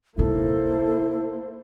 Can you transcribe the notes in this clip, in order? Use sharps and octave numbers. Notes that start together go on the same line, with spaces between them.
C3 A#3 D#4 E4 A4 C5